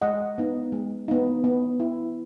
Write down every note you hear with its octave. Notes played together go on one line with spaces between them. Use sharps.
G#3 D#5 F#5
B3 D#4
G#3
B3 D#4
B3
E4